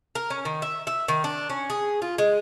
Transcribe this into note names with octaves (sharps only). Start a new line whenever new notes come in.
A#4
C#4
D#3
E5
E5
D#3
D4
C#4
G#4
F4
G#3